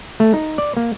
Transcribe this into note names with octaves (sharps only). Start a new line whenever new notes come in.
A3
D#4
D5
A#3